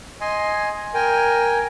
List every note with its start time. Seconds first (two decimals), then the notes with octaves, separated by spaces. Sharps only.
0.21 D#5 G#5 C6
0.94 A#4 G5 G#5